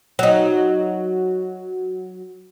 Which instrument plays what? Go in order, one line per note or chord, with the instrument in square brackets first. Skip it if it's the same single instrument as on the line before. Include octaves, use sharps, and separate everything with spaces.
[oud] F#3 D#4